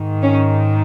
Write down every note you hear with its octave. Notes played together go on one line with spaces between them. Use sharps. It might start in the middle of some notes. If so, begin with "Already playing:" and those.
Already playing: G#2 D#3
C#4